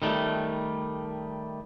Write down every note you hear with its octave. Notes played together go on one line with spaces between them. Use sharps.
D#3 G3 A3